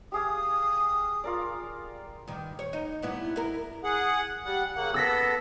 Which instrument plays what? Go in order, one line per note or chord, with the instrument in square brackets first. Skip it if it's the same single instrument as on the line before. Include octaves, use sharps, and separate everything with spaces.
[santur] G4 G#4 F5 [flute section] D#6
[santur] F4 A#4 D5
[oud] G2 D#3
C#5
D#4
G2 B3 E4
E4 A#4
[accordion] G#4 F#5
G3 F#5
C#3 A#3 F#5
[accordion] B3 A4 [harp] E6 A#6 B6